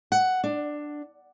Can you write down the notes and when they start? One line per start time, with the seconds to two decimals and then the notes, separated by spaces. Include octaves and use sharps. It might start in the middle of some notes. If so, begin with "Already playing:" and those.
0.12 F#5
0.44 D4